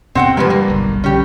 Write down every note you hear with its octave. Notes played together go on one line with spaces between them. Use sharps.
E2 C3 B3 C4 F#5 G5
G2 C3 F3 G3 A#3 B4
A#3
F#1 B1 D3
A#1 D3 C#4 G4